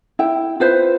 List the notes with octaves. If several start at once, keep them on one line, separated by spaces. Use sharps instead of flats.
E4 G5
F4 B4 C5